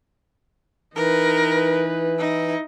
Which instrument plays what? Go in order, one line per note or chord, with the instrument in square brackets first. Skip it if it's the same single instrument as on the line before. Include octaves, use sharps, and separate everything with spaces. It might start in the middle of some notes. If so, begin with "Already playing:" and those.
[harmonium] E3 [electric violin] D#4 B4 [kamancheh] A#4
[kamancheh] D#4 E4